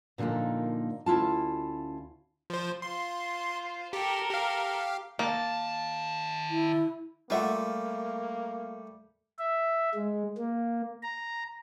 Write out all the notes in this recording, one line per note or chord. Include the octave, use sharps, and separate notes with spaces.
A#2 D3 F3 A#3 D#4
D2 C#4 E4 F4 A5
F3 C5
F4 C5 C6
G4 A4 A#4
G4 F5
D#3 A#3 A5
E4
G3 A3 A#3 F4 E5 F#5
E5
G#3
A#3
A#5